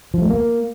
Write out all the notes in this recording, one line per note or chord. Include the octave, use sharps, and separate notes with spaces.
F3
A3
A#3